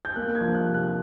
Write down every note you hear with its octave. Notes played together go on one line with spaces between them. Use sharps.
G6
A#3 F#6
G#6
F3
F#6
C3
F#6